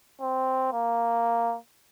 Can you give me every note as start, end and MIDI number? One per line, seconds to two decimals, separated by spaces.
0.21 0.71 60
0.73 1.56 58